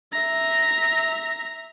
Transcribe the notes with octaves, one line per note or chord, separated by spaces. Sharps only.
E5 A#5